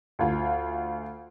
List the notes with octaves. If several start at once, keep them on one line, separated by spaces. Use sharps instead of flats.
D2 F4